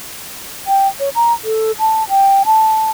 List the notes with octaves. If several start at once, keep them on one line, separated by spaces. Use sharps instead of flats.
G5
C#5
A#5
A4
A5
G5
A5